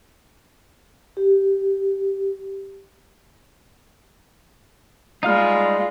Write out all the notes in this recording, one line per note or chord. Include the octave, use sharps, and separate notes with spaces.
G4
G3 G#3 D#4 F4 F5 F6